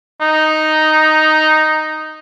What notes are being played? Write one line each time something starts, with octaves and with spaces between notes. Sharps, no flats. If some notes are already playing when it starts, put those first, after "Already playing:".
D#4